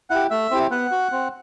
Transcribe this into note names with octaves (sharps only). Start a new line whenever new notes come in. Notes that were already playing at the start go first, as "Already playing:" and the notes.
E4 G4 F#5
A3 E5
C4 E4 G4
B3 F#5
F#4
C4